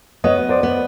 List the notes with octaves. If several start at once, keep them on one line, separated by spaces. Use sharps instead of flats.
B3 C#5 D#5
C5 D5
B3